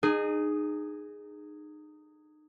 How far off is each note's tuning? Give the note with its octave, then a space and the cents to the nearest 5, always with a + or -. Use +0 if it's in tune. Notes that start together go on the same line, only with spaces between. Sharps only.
D#4 -30 G#4 +0